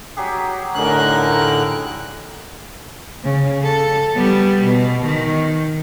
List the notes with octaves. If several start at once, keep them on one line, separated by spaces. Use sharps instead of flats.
F#3 G4 G#4
A2 D3 C#4 D#4 A#4 F#6
C#3
A4
G3 B3
B2
D#3